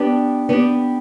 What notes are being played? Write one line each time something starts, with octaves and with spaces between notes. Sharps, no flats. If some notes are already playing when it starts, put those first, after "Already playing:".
Already playing: B3 D4 G4
B3 D4 G4